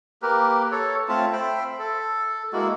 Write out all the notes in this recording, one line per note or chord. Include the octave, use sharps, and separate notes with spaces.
A#3 G4 A#4 B4
A4 C#5
A3 C4 F4 A5
C5 E5 G5 B5
A4
G#3 A#3 E4 F#4